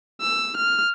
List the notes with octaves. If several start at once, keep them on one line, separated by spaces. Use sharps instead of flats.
E6
F6